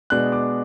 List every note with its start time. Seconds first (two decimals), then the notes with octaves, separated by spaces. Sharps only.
0.10 B2 G#3 B3 D4 F#6
0.32 D6